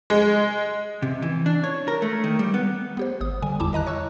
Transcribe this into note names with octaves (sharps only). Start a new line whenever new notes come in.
G#3
C3
E3
D4
C#5
A#4
A3
D#3
G3
B3
B3 G4 C5
G#1 D#6
D3 G3 G#5
E2 E4 A5 D6
D#3 D#5 A#5 F#6
C#5 C#6 E6